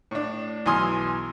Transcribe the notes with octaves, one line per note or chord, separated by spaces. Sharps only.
A2 D4
B1 E3 G#5 C6 D#6 F6